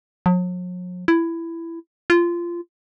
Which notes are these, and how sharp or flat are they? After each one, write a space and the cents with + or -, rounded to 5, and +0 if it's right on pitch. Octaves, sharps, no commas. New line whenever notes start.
F#3 -45
E4 +15
F4 -20